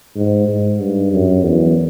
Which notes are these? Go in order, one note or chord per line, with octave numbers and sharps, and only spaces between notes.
G#2
G#2
G2
F#2
E2